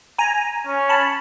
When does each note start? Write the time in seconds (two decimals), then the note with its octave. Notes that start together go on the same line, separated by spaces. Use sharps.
0.18 G#5 A#5
0.67 C#4
0.89 A5 B5